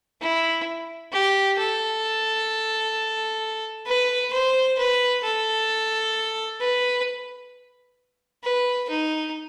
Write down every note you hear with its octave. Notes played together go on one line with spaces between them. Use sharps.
E4
G4
A4
B4
C5
B4
A4
B4
B4
D#4